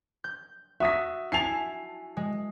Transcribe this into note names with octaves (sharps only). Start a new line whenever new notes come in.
G6
F#4 E5 D#6 A#6 B6
E4 G#5 A5 C7 F7
G#3